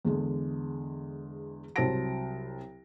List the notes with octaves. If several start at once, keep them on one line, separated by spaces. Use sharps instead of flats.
E2 D3 G#3
C2 F#3 C5 A5 A#6 D7